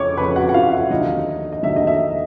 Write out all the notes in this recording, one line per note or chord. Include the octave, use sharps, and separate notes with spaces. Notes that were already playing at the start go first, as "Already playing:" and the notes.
Already playing: F2 C#3 F3 C#5 C#6 D6
F2 C#3 F3 B4 B5
F#4 F#5
F#5
F4 F5
E5
D#2 D3 F#3 D#5
D#5
D#2 D3 F#3 E5
D#5
E5